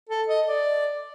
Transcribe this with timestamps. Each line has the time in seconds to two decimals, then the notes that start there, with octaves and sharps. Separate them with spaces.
0.09 A4
0.28 D#5
0.47 D5